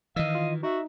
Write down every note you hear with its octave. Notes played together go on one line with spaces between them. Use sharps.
D#3 E3 D#5 F5 E6
F4
D#4 F#4 E5